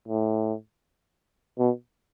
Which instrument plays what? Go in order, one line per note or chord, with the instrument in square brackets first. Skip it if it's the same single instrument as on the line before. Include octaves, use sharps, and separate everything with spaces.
[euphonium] A2
B2